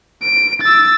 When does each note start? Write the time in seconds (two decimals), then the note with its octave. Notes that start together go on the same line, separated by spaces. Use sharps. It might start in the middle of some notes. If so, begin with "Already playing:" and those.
0.23 D7
0.62 E6 A6